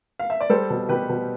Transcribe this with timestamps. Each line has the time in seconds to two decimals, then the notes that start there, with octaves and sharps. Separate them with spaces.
0.19 F5
0.30 E5
0.41 D5
0.49 G3 A4 C5
0.70 B2
0.89 B2 G4 B4
1.09 B2